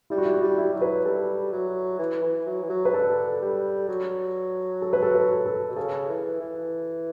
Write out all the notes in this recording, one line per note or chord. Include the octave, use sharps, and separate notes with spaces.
G3 E4
F#4
E4
F#4
G3
E4
F#3
B4
G3 A4
F#3
E3
E3
F#3
E3
F#3
B4
D3 A4
G3
F#3
A4
B4
A4
B4
A4
B2
C#3 A4
E3
E3